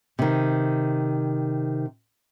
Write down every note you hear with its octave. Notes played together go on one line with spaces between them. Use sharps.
C3 D#3